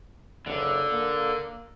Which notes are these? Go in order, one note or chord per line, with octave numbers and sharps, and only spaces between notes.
F#1 D3
A#3